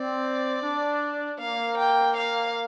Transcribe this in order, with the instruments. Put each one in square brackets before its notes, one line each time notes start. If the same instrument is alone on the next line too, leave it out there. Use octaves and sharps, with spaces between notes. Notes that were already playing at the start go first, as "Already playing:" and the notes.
Already playing: [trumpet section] C4 [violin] D5
[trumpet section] D4
[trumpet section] A#3 [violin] F5
[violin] G5
F5